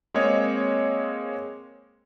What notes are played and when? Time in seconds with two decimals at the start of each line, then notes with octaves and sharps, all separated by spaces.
0.14 G#3 A#3 C4 G#4 C#5 D#5